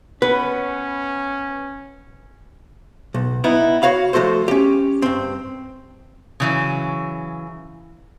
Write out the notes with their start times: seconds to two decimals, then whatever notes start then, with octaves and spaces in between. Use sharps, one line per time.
0.22 B3 C#4 B4
3.14 B1
3.44 B3 D#4 E4
3.82 F#4 C#5 F5 B5
4.13 F3 A3 F#4 A4 C5
4.48 C#4 G4
5.02 G2 C4
6.40 C#3 E3 F#3